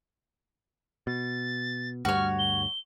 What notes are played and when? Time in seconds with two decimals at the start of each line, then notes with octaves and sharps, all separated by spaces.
1.07 B2 A6
2.05 D2 G2 G3 F#4 C#5 F6
2.39 G7